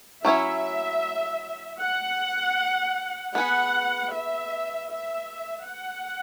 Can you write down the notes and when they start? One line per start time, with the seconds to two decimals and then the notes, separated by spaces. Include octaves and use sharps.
0.25 F#3 C#4 E4 C#5 E5
1.80 F#5
3.35 B3 G#4 B4 F#5
4.13 E5
4.91 E5
5.68 F#5